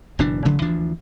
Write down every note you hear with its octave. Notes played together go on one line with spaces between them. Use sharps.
F#1 B2 E3 D4
A1 C#3 F#3
D2 E3 F3 D4